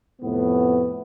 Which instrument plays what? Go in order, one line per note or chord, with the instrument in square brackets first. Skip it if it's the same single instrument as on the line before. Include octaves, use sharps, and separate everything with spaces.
[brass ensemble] F2 A2 C3 B3